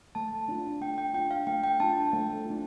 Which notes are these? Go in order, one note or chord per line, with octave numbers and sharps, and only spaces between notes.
A3 A5
D4 F4
A3 G5
G5
D4 F4 G5
F5
A3 G5
G5
D4 F4 A5
A3
F4
D4